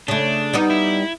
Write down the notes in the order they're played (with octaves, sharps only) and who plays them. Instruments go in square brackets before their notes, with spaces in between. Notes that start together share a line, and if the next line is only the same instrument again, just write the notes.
[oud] C#3 A3 [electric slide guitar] D4
[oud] G3 B3 D#4
[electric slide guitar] E4